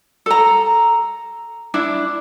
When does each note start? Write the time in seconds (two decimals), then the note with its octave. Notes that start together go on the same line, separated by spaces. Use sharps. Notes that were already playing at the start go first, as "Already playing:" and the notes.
0.26 A4 A#5
1.74 D4 E4